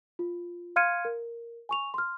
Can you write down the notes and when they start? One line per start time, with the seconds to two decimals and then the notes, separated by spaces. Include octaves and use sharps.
0.19 F4
0.76 F5 C6 F6 G#6 C#7 D#7
1.05 A#4
1.69 G#5 C#6 F7
1.94 C6 F6